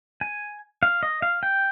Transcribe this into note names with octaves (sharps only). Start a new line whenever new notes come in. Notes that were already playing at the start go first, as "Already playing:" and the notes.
G#5
F5
D#5
F5
G5